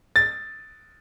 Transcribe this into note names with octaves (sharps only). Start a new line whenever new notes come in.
A6